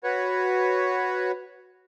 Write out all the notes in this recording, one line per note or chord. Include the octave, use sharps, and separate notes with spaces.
F#4 B4 C#5